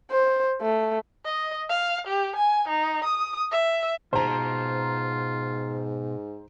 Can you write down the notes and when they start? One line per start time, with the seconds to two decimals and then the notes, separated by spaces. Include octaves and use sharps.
0.11 C5
0.62 A3
1.25 D#5
1.69 F5
2.07 G4
2.36 G#5
2.68 D#4
3.04 D#6
3.51 E5
4.13 G#2 B2 F4 C5 A5 A#5